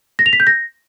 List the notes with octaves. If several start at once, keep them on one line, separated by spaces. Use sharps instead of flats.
A#6
F7
B6
G6
A#6